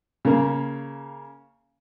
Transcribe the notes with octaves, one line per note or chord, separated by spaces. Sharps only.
C#3 A#3